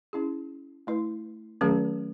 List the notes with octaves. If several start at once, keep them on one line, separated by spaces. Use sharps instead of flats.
C#4 E4 G#4
A3 E4 B4
D#3 F#3 A3 C#4 G#4